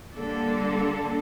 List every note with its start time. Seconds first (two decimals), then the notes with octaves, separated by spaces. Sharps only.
0.16 D3 G3 A#3 D4 A4